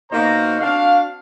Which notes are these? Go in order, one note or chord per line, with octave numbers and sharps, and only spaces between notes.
B2 A#3 D#4 F#4 C5 A#5
C4 D4 F#4 F5